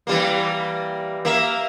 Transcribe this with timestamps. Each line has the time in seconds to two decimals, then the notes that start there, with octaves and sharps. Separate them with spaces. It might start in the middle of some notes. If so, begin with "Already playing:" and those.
0.07 E3 G3 A#3
1.25 A#3 A#4 E5